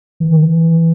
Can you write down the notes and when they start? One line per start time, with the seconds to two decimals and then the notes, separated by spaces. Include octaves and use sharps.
0.20 E3
0.31 D#3
0.43 E3